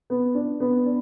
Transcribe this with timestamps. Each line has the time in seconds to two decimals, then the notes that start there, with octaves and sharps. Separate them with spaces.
0.10 B3
0.35 D4
0.60 B3
0.85 D4